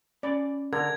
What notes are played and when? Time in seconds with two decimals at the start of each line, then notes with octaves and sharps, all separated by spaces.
0.23 C#4 D5 B5
0.73 D3 A#4 G#6